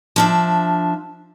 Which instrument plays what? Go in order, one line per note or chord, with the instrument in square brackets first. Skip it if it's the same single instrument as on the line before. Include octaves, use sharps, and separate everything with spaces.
[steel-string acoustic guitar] F3 D4 E5